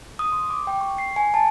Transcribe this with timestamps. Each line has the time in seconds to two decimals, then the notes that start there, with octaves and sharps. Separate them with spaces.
0.19 D#6
0.32 C6
0.50 D6
0.67 G5
0.81 C#6
0.98 C7
1.16 G#5
1.34 A5